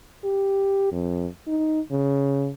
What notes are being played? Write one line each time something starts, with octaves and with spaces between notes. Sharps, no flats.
G4
F2
D#4
C#3